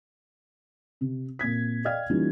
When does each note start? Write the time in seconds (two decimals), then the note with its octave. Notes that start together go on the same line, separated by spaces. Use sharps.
1.01 C3
1.39 A#2 C4 G#6 B6
1.85 D5 D#5 F5 G5 F6 G#6
2.10 E3 G3 A#3 C#4 D#4 F4